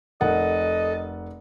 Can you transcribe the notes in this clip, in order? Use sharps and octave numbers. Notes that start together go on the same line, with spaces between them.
F1 A4 A#4 D#5 F#5